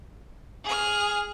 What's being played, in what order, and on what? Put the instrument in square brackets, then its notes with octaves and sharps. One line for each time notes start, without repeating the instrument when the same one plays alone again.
[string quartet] G#4 F6